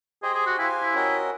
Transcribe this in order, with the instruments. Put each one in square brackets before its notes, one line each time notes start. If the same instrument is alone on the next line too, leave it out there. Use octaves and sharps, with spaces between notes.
[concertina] G4 C5 D#5 G5 [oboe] G#4
[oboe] G#4
F#4
[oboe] E4 [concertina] G4 C5 F5 G#5
[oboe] E4
[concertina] C#4 F#4 A#4 D#5